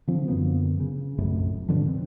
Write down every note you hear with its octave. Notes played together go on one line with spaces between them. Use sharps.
D3 F3 C4
F#2 D3 A#3 B3
C#3
F1 B1 F#2 A2
G#2 B2 D3 F3
C4